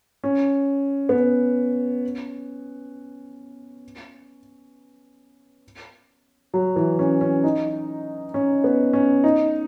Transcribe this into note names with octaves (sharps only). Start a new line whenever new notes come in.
C#4
B3
C#4
F#3
E3
C#4
C#4
D#4
C#4
B3
C#4
D#4